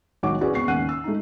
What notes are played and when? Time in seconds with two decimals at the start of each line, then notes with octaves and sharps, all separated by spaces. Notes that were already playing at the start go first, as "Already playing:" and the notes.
0.23 B1 D#3 F#4 C#5 F#5 D6
0.41 C#4 E4 F#4 G#4 B4 D5
0.54 C#3 B3 C4 C#6 C7
0.68 D#2 C#4 F#5 F#6 D#7
0.89 E6
1.04 A3 D#4